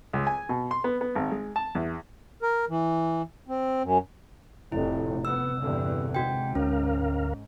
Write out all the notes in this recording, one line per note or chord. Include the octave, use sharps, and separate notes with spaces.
C#2
G#5
B2
C6
B3
B3
G#1
G#3
A5
E2
A#4
E3
C4
F#2
F1 A2 C3 E4
B3 E6
E2 G2 D3
G#2 F#4 G5
D2 C#4 A#4 F5